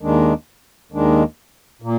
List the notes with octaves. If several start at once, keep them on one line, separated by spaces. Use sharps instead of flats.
D#2 D#3 G#3 D4
D#2 D#3 G#3 D4
A#2